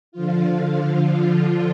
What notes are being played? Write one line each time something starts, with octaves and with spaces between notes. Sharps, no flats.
D3 F3 F4